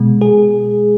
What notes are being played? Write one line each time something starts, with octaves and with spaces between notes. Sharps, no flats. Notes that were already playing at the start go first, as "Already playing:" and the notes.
Already playing: B2 G#3
G#4